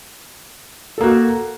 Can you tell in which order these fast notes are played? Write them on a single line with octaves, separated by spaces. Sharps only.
A4 A#3 F#4